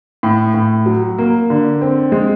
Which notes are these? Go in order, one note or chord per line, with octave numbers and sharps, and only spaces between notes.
A2
A2
F#3
A#3
D3
C4
G#3